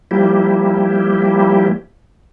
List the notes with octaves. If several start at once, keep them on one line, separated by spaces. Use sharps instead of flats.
F3 G3 A#3 E4 G4